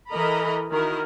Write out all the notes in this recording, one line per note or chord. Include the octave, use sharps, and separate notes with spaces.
E3 A4 A#4 D#5 A#5 B5
D#3 E4 F#4 A#4 D#5